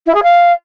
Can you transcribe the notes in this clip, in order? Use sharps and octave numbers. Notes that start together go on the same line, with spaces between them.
E4
G#4
F5